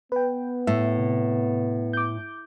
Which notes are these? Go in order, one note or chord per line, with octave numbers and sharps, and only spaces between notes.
B3 B4 G5
A2 E5
C3
D6 G6